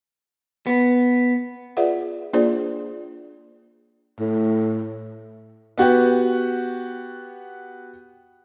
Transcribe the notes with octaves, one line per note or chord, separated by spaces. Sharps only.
B3
F4 G#4 B4 D5 E5 F#5
A#3 D4 F4 G#4 C5 D5
A2
B3 F#4 G4